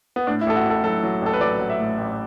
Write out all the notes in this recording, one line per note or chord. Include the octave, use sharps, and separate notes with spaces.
B3
A2 D4
E4
A1 A4
F#4
A1 A4
F#3 A4
F#3
A1 A4
B4
F#3 D5
F#3
E5
A2
A1